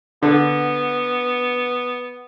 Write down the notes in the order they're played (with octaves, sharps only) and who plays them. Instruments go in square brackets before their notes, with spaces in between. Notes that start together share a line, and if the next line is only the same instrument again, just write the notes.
[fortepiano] D3 [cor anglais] B3